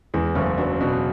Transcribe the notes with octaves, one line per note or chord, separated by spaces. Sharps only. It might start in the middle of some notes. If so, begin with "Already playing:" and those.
E2 E3 G#3
F#1 A3 C#4
F#3 B3 D4
B2 D4 F#4